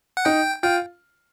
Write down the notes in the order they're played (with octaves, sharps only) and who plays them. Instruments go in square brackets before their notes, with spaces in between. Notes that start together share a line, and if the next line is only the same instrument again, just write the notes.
[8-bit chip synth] F#5
[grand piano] D#4 [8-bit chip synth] G5
[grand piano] F4 [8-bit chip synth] G5